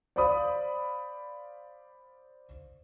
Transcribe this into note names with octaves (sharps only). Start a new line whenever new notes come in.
C5 D5 F5 B5 D#6